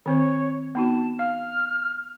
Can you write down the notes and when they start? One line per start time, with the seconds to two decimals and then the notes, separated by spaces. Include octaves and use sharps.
0.06 D#3 C4 C5 C#5
0.75 B3 D#4 F#4 A5
1.19 F5 F6